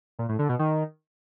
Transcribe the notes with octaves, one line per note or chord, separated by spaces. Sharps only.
A#2
A2
D3
B2
D#3